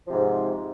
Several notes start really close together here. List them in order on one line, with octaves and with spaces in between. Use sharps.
F3 C3 G#2